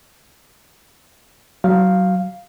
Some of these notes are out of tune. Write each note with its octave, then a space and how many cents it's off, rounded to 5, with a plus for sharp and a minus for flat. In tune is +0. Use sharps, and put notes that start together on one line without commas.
F#3 +20 F5 +0